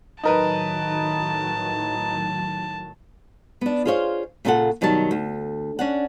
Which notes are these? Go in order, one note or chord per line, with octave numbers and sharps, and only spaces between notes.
A2 D#3 F#3 D#4 A#4 B4 A5
B3 D4
F4 G#4 C5 C#5 E5 F5
A#2 C#3 D4 F4 A4 F#5
B2 D#3 F#3 G3 A5
D2
C#4 D4 F#5